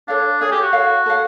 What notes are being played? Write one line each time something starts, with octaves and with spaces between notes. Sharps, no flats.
D4 A4 C#5 F5
G#4 A4 C#5 F5
G4
F#4
A4 C#5 F5
A4 C#5 F5